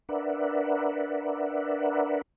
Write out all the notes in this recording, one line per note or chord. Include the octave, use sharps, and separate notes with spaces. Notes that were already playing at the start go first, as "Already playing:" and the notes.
D4 A#4 B4 D5 E5 F#5